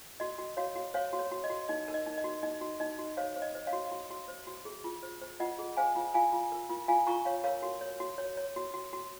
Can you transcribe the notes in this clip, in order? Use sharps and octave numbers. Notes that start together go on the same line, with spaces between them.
F#4 D#5
F#4
F#4 C#5 F5
F#4
C5 C#5 F5
F#4
C#5
F#4
D#5
F#4
D#4 D#5
A#4
D#5
D#4
D#5
F#4
D#4 D#5
F#4
D#4 D#5
F#4
C5 C#5 F5
C5
D#5
C5
C#5 F5
F#4
F#4
F#4
C5
F#4
G#4
F4
C5
C5
F4 D#5 F#5
G#4
C5 F5 G#5
F4
F4 F5 G#5
F4
A#4
F4
F4 F5 G#5
F4 A#5 C#6
C#5 F5
A#4 C#5 F5
F#4
C#5
F#4
C#5
C#5
F#4
F#4
F#4